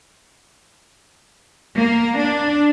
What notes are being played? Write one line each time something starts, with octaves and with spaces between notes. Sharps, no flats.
A#3
D4